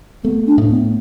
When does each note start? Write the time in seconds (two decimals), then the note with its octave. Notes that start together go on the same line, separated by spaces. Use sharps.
0.24 A3 B3
0.47 D4
0.58 A2
0.70 B3